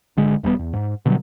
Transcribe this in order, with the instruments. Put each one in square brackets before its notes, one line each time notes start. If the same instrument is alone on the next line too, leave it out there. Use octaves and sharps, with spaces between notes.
[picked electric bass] G#1 D3 G#3
E1 G3 A3 B3
E2
G#2
B2 D3 F#3 G3